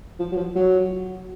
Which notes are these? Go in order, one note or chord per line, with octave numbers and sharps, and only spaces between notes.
F3
F#3
F3
F#3